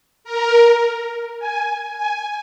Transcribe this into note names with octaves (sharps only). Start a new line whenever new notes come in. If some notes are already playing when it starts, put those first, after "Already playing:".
A#4
G#5
G#5